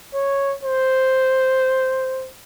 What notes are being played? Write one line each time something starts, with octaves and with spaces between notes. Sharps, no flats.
C#5
C5